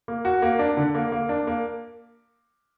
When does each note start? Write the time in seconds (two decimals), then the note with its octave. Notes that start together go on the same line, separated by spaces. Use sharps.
0.08 A#3
0.25 F#4
0.42 A#3
0.59 D4
0.77 D3
0.95 A#3
1.12 A#3
1.29 D4
1.47 A#3